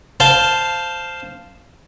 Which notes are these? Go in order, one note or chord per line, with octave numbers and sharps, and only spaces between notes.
C5 F5 A5 C6